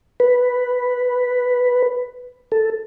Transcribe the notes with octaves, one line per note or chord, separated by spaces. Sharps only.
B4
A4